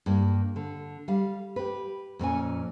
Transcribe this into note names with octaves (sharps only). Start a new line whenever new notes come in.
G2 A#3
D3
G3 F5
G4 B4
F2 A#2 C#4 G#5